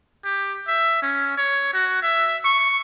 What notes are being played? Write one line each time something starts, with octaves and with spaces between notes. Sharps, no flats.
G4
E5
C#4
C#5
F#4
E5
C#6